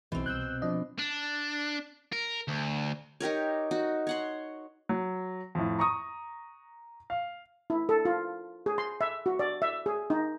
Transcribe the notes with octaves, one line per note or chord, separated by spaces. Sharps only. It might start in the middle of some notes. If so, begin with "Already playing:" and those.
B1 B2 E3 C4
C2 E6 F#6 G6
F3 D4 D#5
D4
A#4
D2
D#4 G4 A#4 C#5
D#4 F#4
C#5 F#5 C6
F#3
F2 A2
A#5 C#6 D#6
F5
E4
A4
F4
G#4
C6
E5
F#4
D5
E5
G#4
D#4